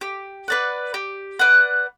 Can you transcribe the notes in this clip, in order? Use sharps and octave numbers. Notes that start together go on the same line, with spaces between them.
G4
B4 D5 F#5
G4
B4 D5 F#5